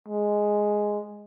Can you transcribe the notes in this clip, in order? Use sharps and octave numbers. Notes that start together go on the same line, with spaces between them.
G#3